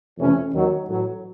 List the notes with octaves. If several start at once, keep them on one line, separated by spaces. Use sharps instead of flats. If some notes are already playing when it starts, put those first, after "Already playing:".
F2 C3 E3 A3 C#4
D#2 D#3 F#3
A1 A2 F#3